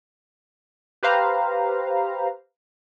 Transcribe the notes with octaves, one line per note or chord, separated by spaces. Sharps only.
G4 B4 C5 F5 A#5